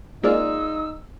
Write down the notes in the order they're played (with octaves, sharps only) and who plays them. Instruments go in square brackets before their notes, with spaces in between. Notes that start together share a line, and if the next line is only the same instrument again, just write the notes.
[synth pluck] G#3 A#3 D5 [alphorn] D#4 [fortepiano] F4 G#4 F6 [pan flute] E6